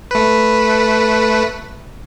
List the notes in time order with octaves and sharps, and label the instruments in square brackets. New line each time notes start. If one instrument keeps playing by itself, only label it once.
[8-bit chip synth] A3 B4